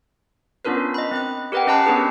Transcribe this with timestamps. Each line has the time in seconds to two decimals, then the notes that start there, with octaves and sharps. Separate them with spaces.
0.65 B3 C#4 D4 F4 A#4 B4
0.94 D#5 B5
1.11 C4 D#5 F#6
1.52 G4 A#4 B4 D#5 F#5 G5
1.67 C#4 D#5 A5 B5 F#6 C7
1.86 B3 C#4 D4 G4 G#4 B4